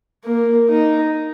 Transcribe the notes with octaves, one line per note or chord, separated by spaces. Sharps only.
A#3
D#4